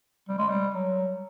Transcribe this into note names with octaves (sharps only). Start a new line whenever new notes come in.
G3
G#3
G3
F#3